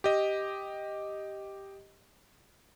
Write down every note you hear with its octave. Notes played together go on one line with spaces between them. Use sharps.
G4 D#5